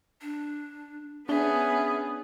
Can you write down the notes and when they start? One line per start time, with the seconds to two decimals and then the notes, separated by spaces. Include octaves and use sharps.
0.22 D4
1.29 B3 C#4 D4 G#4 E5